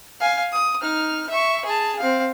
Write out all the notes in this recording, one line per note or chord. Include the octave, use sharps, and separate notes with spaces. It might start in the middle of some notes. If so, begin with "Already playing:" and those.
F5 G#5
D#6
D#4 F6
E5 C#6
G#4 A5
C4 F5